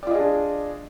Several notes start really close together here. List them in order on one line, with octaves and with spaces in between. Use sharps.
D5 F4 D#5 G#4 D4